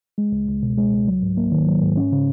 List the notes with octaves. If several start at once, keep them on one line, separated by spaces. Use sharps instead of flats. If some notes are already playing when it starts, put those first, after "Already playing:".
G#3
C#2
C#2
B2
G#3
C#2
F#3
G#2
A#3
D#3
F#3
G#2
C#4
C#3